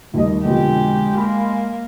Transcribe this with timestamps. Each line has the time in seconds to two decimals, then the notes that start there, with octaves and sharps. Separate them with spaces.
0.14 D#2 G3 A3 D#5
0.45 F2 B2 D3 G#3 G4
1.18 A#3 B5